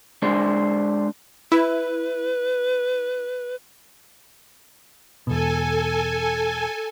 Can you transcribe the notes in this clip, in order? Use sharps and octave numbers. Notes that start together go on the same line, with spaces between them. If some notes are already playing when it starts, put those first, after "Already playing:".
G#3 D4 C5
E4 B4
E2 B2 A4 G#5